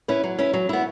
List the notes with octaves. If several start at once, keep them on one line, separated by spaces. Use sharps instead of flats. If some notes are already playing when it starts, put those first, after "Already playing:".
C#4 E4 B4
F#3
C#4 E4 B4
F#3
B3 E4